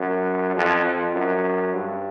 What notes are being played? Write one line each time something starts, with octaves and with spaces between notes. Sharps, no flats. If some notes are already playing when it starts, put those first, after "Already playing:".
Already playing: F#2
F2
F2
F#2
G2